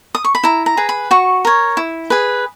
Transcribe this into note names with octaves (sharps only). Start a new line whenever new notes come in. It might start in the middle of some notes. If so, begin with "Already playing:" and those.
D#6
C#6
B5
E4 A#5
A#5
G#4 B4
B5
F#4 C#6
A#4 C#5
E4
G#4 B4